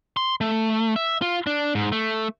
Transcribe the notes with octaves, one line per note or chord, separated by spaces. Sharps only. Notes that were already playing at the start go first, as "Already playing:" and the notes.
C6
A3
E5
F4
D4
G#2
A3